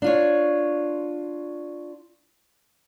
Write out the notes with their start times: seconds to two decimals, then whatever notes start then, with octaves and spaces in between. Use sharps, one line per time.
0.02 D4 F4 C#5